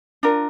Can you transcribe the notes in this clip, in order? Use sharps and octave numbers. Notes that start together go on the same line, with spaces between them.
D4 F4 A#4